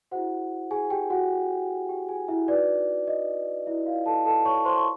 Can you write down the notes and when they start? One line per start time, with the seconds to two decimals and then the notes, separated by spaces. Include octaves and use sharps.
0.11 E4 F#4 G#4 C5 F#5
0.71 G#4 G#5
0.90 G4 G5
1.10 F#4 F#5
1.89 G4 G5
2.09 G#4 G#5
2.28 E4 E5
2.48 D#4 F#4 B4 D5
3.07 D#5
3.67 E4 E5
3.86 F4 F5
4.06 A4 A5
4.26 A4 A5
4.45 C#5 C#6
4.65 C5 C6
4.77 C#6